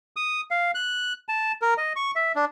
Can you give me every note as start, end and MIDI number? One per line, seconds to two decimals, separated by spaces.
0.16 0.41 87
0.51 0.71 77
0.75 1.13 90
1.29 1.52 81
1.62 1.74 70
1.78 1.93 75
1.96 2.11 85
2.16 2.32 76
2.36 2.45 62